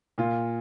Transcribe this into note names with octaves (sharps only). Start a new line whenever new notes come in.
A#2 F4